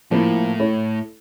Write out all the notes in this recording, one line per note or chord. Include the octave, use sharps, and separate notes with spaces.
A2 F3 A#3 E4
A3 E4 A4 C#5